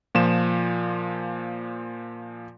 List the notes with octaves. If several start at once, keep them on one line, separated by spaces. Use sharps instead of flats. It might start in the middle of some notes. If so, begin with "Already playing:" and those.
A#2 F3 E7